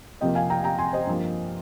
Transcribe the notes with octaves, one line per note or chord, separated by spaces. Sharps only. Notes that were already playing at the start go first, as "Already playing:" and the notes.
F2 C3 F3 A#3 D#5 G5
F5 G#5
G5 A#5
G5 A#5
G#5 C6
C5 D#5
G2 F3 A#3